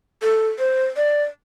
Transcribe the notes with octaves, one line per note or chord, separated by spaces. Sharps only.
A4
C5
D5